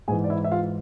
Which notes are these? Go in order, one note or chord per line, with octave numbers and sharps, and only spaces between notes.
G#2 E3 G#4 G#5
D5
E4 E5
E5
F4 F5